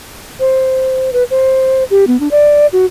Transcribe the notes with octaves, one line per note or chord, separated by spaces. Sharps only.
C5
B4
C5
G4
B3
D4
D5
F#4